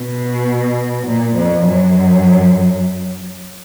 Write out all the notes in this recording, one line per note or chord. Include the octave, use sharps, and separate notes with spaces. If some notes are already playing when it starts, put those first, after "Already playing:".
Already playing: B2
A#2
F2
F#2